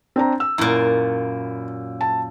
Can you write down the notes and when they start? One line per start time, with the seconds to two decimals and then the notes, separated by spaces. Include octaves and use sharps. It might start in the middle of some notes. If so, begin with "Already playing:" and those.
0.16 C4 D4 A#5
0.40 E6
0.58 F#2 A#2 E4
2.01 A5